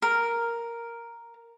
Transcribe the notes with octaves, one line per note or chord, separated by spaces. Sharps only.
A#4